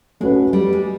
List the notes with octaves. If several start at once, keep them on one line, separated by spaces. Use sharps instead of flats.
G#3 A3 C#4 F#4 B4
G3
G#3